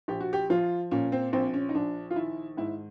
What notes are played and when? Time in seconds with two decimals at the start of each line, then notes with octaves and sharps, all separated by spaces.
0.08 A#1 G4
0.20 F#4
0.33 G4
0.50 F3 F4
0.91 A#2 C#4
1.12 C4
1.33 A#1 C4
1.54 C#4
1.69 D#4
1.75 A#1 D4
2.11 F4
2.16 D#3 E4
2.57 G#2 E4